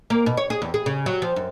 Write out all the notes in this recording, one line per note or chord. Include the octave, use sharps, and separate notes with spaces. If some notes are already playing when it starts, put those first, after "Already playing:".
A#3
B2
C#5
G#4
E2
G#4
C#3
F#3
F3
F#2